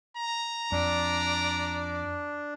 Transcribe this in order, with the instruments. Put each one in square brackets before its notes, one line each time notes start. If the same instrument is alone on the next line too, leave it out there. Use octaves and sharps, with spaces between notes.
[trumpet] A#5
[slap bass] F2 [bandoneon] D4 [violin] D5